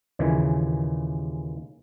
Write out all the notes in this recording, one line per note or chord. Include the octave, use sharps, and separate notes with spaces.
D#2 A#2 C#3 E3 G#3